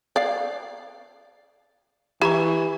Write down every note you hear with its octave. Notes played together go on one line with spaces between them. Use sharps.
D5 F5
E3 E4 G4 A#5 C#6